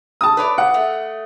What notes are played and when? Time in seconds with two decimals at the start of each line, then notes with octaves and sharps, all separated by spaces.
0.21 A5 D#6
0.37 B4 C#5 D5
0.58 F#5
0.74 A3